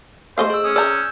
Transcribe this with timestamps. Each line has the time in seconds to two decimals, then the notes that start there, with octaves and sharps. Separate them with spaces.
0.38 A3 C5 D#5 F5
0.50 G#4 E6
0.64 C#4 D#6
0.76 D5 A#5 E6 G6 G#6